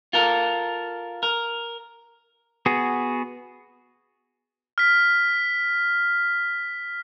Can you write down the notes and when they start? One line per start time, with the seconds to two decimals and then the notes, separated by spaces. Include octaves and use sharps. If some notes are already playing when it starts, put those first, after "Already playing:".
0.13 F4 A4 A#4
1.23 A#4
2.66 B3 F#4 G#4
4.78 F6 B6